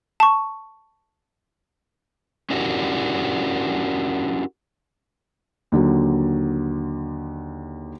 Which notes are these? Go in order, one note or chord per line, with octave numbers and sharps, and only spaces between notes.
A5 C#6
C#4 D4 E4 F#4 G4 A#4
D#2 D3 F#3